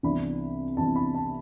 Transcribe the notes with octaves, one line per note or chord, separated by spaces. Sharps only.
C2 C3 E3 B3 D4 B5
C2 C3 E3 B3 D4 A5
B5
A5